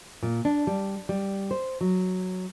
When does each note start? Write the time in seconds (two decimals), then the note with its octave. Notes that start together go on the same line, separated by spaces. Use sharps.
0.23 A#2
0.45 D4
0.67 G3
1.09 G3
1.51 C5
1.81 F#3